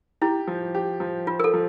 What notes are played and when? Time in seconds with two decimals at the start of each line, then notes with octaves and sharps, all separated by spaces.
0.21 E4 G4
0.47 F3
0.75 G4
1.00 F3
1.27 F4 C5
1.40 A#4
1.44 A4
1.54 F3